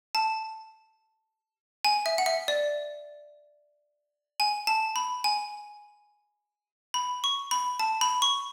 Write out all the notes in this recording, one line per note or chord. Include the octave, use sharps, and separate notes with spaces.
A5
G#5
E5
F#5
E5
D5
G#5
A5
B5
G#5
B5
C#6
B5
A5
B5
C#6